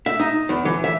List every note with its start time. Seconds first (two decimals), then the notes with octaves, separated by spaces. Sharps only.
0.06 E5
0.20 D#4
0.49 E2
0.65 E3
0.84 E5